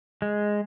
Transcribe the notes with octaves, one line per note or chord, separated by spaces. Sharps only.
G#3